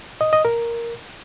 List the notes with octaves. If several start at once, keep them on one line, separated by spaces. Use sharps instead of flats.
D#5
D#5
A#4